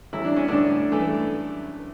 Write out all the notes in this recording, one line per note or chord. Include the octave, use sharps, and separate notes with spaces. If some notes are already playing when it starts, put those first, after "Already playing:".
A1 E4
D4
C#4
A2 D3 D4
E3 A3